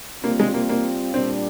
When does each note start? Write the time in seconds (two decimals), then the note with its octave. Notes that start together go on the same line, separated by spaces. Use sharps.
0.24 G3 A#3 C4 F4
0.40 G#3
0.54 A#3
0.69 A#3
1.14 A#2 G3 C4 D4